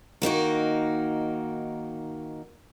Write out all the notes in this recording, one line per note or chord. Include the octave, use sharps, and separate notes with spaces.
D#3 A#3 D#4 F#4